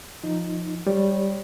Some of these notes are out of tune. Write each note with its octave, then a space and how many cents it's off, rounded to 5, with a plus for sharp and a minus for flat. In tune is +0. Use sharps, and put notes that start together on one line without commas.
F3 +0 D#4 +0
G3 +0 C#5 -15